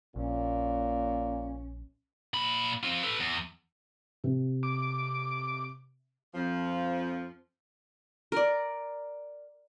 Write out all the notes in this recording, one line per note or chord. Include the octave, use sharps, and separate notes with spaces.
A#1 A#2 C#4
A#2 B5
C4 F4
A4 B4
E2
C3
D6
F2 F3
A#4 D5